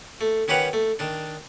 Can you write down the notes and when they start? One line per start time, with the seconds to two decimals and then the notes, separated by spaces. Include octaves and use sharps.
0.21 A3
0.48 D#3 C#4 G4 B4 F#5 A#5
0.73 A3
0.99 D#3 D4